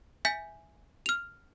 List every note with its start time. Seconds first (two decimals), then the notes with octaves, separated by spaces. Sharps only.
0.25 E5 G#5 G6 B6
1.06 F6 F7